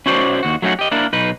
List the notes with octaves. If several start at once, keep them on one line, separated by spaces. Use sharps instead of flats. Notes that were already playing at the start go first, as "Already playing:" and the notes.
C#4 E4 F#4 C5 D5
D#2 F#4
F#3 A3 C#4 D#4 F#4
G4 D#5
A#3 D4 E4 A#4
B1 D#4 B4